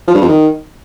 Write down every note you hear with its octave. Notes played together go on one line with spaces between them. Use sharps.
F3
G2
F2
D#3